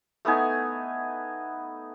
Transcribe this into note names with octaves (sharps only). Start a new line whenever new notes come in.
A3 B3 D#4 G#5